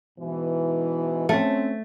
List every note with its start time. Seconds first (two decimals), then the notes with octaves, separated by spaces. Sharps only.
0.19 G#2 B2 E3
1.29 A3 C4 C#4